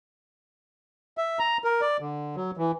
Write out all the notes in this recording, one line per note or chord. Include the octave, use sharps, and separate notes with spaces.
E5
A#5
A#4
D5
D3
F#3
E3